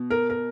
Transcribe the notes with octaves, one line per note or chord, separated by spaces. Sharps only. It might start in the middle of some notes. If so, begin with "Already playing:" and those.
Already playing: B2
A#4
A#4